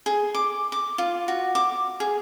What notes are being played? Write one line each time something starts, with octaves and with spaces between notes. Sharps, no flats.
G#4
D6
D6
F4
F#4
D6
G#4